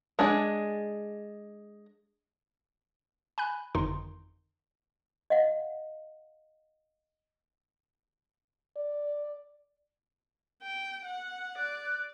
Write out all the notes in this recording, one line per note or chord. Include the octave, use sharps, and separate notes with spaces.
G#3 D4 G#4
G#5 B5 F#6
G1 F2 D#3 D#4 C6
D#5 F5 F#5
D5
G5
F#5
D5 F#6